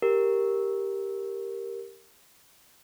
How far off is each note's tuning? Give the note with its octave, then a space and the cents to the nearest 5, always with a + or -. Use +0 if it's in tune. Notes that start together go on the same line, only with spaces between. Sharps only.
G4 +5 A#4 +0